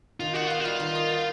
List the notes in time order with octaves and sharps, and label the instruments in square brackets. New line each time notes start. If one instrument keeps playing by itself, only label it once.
[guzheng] D#3 [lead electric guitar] F4
[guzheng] D#4 [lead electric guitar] F#4
[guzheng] B3 [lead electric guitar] F4
[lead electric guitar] F#4
[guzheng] G3 [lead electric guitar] F4
[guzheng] D#3
D#4
B3